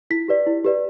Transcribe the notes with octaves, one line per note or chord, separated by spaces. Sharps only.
E4 B6
G4 B4 D5
E4
G4 B4 D5